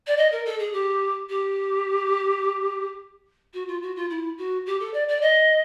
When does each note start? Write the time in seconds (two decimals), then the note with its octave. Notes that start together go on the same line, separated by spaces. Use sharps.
0.07 D5
0.17 D#5
0.31 A#4
0.45 A4
0.59 G#4
0.73 G4
1.29 G4
3.53 F#4
3.67 F4
3.82 F#4
3.95 F4
4.10 E4
4.38 F#4
4.66 G4
4.80 A4
4.93 D5
5.08 D5
5.21 D#5